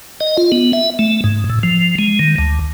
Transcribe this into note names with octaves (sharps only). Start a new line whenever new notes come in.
D#5
F4
B3
E5
A3
G#2
A2
F3
G#3
D#3
D2